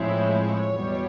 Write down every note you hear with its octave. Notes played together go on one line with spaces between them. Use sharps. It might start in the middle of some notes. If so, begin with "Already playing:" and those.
Already playing: A2 F3 G#3 C4 E4 C#5
E2 B2 G3